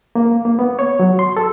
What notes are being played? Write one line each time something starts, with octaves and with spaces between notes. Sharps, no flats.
A#3
A#3
B3
C#5
F#3
C6
A4